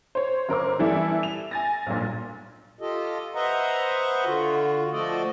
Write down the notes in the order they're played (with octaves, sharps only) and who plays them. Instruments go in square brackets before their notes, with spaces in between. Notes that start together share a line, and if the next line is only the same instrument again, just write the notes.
[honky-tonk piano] C5 C#5
G1 A#4 C5 D6
E3 G3 B3 E4 A4 E5
F7
G#5 A6 A#6
B1 G2 A#2
[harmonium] F4 G4 A4 D#5
B4 C5 D#5 E5 F#5 A#5
D3 F4 F#4
F3 A3 F#4 A4 D5 D#5